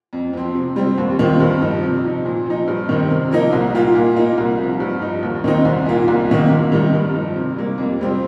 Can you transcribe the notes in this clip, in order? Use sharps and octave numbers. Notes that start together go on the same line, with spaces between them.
F2
F3 C4
C3
G3 C4
D#2
D#3 C4 F4
G2
F3 D#4
C3
F3 D#4
A#2
F3 D#4
G2
D#3 C4 D#4
C3
F3 A#3 D#4
C2
A#2 A#3 F4
A#2
A#3 D#4
C2
C3 F3
G2
F3 D#4
D#2
D#3 C4 D#4
C2
A#2 A#3 F4
C2
C3 D#3 A#3
C3
D#3 G3 D#4
G2
F3 D#4
C3
G3 A#3
F2
C3 G3 C4